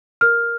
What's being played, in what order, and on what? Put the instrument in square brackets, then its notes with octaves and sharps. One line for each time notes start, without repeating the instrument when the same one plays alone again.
[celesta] A#4 F6